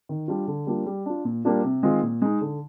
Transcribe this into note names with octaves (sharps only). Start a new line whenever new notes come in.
D#3
G3 D4 F4
D3
G3 A#3 D4 F4
G3
D4 F4
A#2
G3 A#3 D4 F4
C3
D#3 G#3 C4 F4
A#2
G#3 D#4
D3